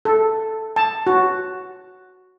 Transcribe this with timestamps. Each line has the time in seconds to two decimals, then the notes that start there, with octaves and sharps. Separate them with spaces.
0.05 A4
0.76 A5
1.07 F#4